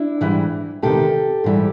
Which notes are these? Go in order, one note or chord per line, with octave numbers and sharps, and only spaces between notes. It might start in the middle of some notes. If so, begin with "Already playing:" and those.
Already playing: D4 E4
G#2 E3 G3
E2 C3 D#3 G4 A4
G#2 E3 G3